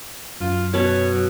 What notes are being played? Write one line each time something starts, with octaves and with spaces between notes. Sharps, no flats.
F#2 F4
B2 B4 C#5 A5
F#3